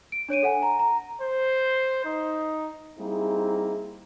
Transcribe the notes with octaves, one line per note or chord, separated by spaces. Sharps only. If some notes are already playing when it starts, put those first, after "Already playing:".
D7
D4 C#5 D7 D#7
A4 F#5 G#5
A#5
A#5
C5
D#4
G3 A#3 C4 D#4 E4 G#4